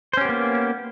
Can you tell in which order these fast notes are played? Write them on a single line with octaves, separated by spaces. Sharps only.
C5 C#4 G4 B3 A#3